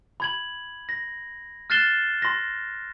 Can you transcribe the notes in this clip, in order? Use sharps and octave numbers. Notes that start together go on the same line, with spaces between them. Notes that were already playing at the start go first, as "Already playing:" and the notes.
B5 G#6 F#7
A#6
F6 F#6 A6 C7 E7 G7
C6 A#6